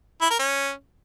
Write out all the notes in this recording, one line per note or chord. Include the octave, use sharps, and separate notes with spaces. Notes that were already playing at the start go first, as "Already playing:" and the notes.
E4
A#4
C#4